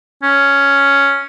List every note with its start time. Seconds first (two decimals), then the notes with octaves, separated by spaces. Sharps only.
0.23 C#4